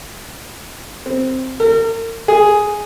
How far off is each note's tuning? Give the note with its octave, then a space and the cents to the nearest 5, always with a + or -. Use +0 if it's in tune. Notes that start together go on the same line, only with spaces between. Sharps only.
C4 -5
A#4 -40
G#4 +0